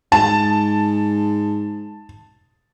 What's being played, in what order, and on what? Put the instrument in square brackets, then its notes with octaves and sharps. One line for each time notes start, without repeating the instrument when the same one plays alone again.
[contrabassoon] G#2 [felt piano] A5